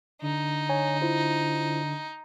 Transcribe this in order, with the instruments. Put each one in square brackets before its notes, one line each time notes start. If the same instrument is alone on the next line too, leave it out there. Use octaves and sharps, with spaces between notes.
[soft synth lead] D3 [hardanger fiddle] D#4
[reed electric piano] C#5 G#5
E4 F4 C5